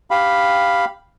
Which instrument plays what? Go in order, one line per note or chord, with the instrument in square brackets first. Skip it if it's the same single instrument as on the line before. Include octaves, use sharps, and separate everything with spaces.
[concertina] G4 F5 B5